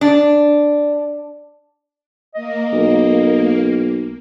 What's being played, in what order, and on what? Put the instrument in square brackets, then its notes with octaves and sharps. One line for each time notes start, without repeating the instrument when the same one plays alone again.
[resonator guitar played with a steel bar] D4
[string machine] A#3 [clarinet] D#5
[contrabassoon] B1